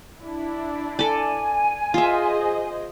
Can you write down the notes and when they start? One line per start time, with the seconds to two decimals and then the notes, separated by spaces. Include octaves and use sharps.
0.20 D4 E4
0.99 A4 D5 G#5
1.94 F4 G#4 C5 D#5 E5